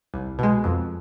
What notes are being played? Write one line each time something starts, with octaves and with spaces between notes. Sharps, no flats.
C2
B2 G#3
F2